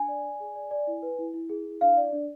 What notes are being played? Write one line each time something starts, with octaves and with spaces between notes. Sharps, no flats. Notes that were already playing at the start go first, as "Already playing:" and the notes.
Already playing: D4 G#5
D5
D5
G#4
D5
D5
E4
B4
E4
E4
G#4
E4
D4 F5
D5
D4